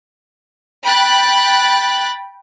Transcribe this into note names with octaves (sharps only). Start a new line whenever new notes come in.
G5 B5 F#6 A6